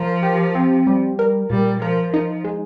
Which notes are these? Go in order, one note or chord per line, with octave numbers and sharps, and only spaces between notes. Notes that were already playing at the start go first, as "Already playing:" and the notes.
Already playing: F3 A#4
G4
C4
G3
A#4
A#2 G3
F3 A#4
F3 D#4
G#3